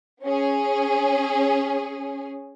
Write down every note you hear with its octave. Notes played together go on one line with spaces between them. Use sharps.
C#4 G#4